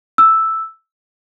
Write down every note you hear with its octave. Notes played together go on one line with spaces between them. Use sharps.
E6